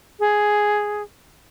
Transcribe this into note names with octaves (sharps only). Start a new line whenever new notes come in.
G#4